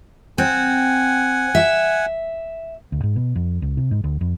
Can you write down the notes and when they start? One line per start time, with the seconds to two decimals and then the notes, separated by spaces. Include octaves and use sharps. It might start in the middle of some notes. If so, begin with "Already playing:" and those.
0.38 C4 F#5 G#5
1.55 E5
2.92 D2
3.03 G#2
3.16 B2
3.35 F2
3.62 C#2
3.77 C3
3.91 G#2
4.04 D2
4.21 F2